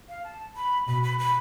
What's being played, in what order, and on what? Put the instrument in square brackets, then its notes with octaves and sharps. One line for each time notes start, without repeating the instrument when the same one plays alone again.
[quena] F5
A5
B5
[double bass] B2 [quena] B5
[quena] B5
B5